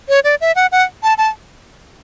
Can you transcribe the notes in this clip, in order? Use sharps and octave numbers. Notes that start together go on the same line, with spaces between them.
C#5
D5
E5
F#5
F#5
A5
A5